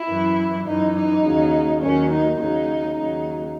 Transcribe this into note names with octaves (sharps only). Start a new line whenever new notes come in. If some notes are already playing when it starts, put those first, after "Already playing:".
Already playing: E4
F#2 E3
F#2 E3 D#4
D#4
D#2 C#3 F#3
D#2 D#3 F#3 C#4
D#4
D#2 C#3 F#3 D#4
D#2 C#3 F#3 D#4